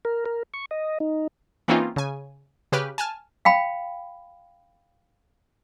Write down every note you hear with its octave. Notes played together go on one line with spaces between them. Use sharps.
A#4
A#4
C#6
D#5
D#4
E3 A#3 C4 C#4 D#4 F4
C#3 G#5
C#3 G4 B4 F6
G#5 A5 F6
F5 G5 B5